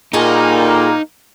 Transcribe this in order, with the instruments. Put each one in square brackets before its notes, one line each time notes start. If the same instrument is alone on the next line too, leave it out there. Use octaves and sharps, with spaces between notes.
[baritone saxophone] A#2 [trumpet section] G3 A#3 [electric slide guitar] D#4 [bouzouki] F#4 G#4 A4